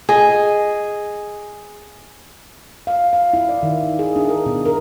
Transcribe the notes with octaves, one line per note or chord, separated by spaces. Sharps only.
G#4 D#5
F5
F5
E4
D5
D#3
G#4
D4
A#4
B2
A#4